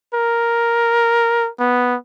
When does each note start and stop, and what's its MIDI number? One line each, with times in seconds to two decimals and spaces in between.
0.14 1.49 70
1.60 1.96 59